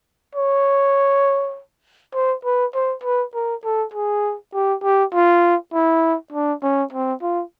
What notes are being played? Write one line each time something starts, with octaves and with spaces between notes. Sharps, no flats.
C#5
C5
B4
C5
B4
A#4
A4
G#4
G4
G4
F4
E4
D4
C#4
C4
F4